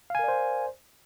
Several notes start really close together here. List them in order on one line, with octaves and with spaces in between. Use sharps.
F5 G#5 A#4 D5 C5